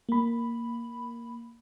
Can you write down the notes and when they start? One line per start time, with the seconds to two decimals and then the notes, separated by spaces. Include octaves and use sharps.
0.09 A#3 B5